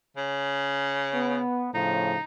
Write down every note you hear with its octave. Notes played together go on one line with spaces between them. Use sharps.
C#3
B3
A2 C#3 F3 D#4